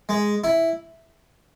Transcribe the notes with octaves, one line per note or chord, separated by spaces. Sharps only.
G#3
E4